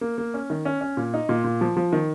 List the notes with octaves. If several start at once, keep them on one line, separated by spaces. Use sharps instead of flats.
A#3
A#3
C#4
D#3
C#4
C#4
A#2
D#4
A#2
A#2
F3
F3
D#3